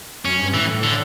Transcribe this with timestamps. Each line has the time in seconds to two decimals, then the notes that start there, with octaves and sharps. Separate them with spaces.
0.25 F#2 C#4
0.39 G2
0.54 A2 E3
0.83 D3